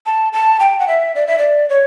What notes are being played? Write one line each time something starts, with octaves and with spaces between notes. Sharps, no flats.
A5
A5
G5
F#5
E5
D5
E5
D5
C#5